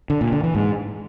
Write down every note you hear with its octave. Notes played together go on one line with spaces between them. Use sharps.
D3
A#2
D3
E3
G#2